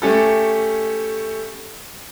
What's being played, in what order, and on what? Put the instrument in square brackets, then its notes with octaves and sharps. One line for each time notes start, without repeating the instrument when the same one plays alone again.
[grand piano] A3 C#4 G4 A4